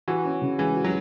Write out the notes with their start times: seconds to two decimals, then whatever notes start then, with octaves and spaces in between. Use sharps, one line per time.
0.08 E3 F#4
0.25 C#4
0.41 C#3
0.58 E3 G#3
0.75 F#4
0.84 F#3